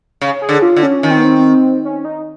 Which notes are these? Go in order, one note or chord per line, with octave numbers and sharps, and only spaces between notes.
C#3
G#4
D3
F4
D3
C#4
D#3 C#4
C4
B3
C4
C#4
D#4